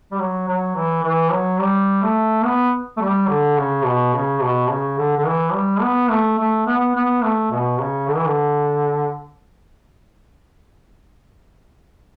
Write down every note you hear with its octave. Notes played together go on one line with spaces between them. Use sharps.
G3
F#3
F#3
E3
E3
F#3
G3
A3
B3
A3
G3
D3
C#3
B2
C#3
B2
C#3
D3
D3
E3
G3
B3
A3
A3
B3
B3
A3
B2
C#3
D3
E3
D3